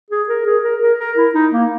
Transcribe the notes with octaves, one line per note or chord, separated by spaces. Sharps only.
G#4
A#4
G#4
A#4
A#4
A#4
E4
D#4
A#3